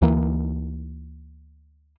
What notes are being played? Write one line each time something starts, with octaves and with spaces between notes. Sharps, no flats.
D2 E3 A#3